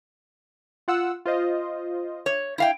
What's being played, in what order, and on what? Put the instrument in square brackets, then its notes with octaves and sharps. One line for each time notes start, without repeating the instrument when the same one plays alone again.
[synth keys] F4 F#5 E6
F4 C5 D#5
[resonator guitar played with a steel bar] C#5
E4 F5 G5